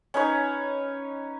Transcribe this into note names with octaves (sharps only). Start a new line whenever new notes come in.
C#4 D#4 B4 C#5